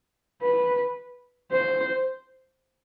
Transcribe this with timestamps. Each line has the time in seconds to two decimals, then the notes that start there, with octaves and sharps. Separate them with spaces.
0.42 B4
1.52 C5